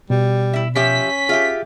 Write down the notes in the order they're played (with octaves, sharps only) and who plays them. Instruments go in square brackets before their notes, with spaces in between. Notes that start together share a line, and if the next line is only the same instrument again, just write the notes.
[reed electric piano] B2 [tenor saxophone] G3
[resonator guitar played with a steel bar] E4 E5
[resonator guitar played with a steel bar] F3 G4 E5 [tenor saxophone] C#4 [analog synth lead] B6
[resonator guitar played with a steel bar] F4 G4 [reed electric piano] G#4 E5